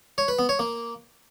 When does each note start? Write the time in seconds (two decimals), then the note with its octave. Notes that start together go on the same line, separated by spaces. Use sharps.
0.18 C#5
0.28 B4
0.39 B3
0.49 C#5
0.59 A#3